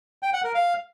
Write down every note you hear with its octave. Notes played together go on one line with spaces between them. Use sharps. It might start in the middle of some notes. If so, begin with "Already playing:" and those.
G5
F#5
A#4
F5